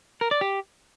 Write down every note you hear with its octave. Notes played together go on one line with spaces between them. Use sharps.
A#4
D5
G4